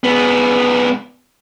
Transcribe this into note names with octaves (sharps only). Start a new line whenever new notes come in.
G#2 B3